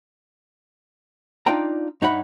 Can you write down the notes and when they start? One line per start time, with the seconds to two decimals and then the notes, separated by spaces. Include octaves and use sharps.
1.46 D4 D#4 F4 D5 G5 A#5
2.02 G2 D#4 C#5 E5 F#5 B5